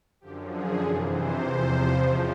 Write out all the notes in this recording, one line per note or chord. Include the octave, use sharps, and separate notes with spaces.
F#2 D3 F3 G4
G#4
F2 C3 E3 A4
C5
E2 C3 F3
F2 C#3 F3